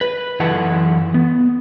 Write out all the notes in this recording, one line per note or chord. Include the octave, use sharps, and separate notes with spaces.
B4
F#2 E3 E4 A4 F#5 A5
B3